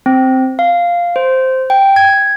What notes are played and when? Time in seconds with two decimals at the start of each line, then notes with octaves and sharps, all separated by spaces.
0.06 C4
0.59 F5
1.16 C5
1.70 G5
1.96 G#6